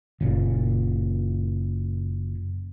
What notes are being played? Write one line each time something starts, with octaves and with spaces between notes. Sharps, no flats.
F#1 A#2